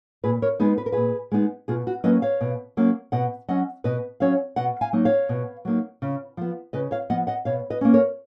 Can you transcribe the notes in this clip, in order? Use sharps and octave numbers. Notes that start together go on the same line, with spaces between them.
A#2 G#4 B4
A#4 C#5
G#3 B3 D#4 G#4 B4
B4
A#4
A#2 G#4 B4
G#3 B3 D#4
B2 F4 G#4
F#4
F#3 A#3 C#4 B4 D#5
C#5 F5
B2
F#3 A#3 C#4
B2 D#5 F#5
F#3 C#4 D#5 F#5
B2 B4 D#5
F#3 C#4 C#5 F5
B2 D#5 F#5
F5 G#5
F#3 A#3 D#4
C#5 F5
B2
F#3 A#3 D#4
C#3
F3 B3
C#3 B4 D#5
C#5 F5
F3 B3 D#5 F#5
D#5 F#5
B2 C#5 F5
B4 D#5
A#3 C#4
A#4 C#5